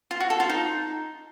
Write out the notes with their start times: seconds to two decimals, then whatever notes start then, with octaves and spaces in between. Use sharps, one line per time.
0.11 F4
0.20 F#4
0.30 A4
0.40 F4
0.50 D#4